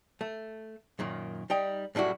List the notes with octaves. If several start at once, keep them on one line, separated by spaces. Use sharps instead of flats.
A3
F#2 A#2 D#3
G3 D#4 G5
F#2 A2 G3 E4 F#4